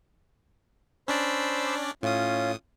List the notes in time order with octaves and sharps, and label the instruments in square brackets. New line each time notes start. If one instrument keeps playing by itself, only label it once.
[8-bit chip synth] C#4 D4 D5 [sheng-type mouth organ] C5 B5 E6
[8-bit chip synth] A2 D#6 [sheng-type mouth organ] C#4 F4